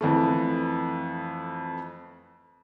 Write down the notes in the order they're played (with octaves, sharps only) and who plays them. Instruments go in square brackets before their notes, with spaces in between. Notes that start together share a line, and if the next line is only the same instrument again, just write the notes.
[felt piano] F2 E3 A3